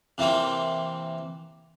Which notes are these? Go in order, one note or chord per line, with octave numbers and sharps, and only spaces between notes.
C3 E3 A#3 C4